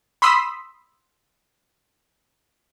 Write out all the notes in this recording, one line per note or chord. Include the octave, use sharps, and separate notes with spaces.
B5 C6 D#6 E6 B6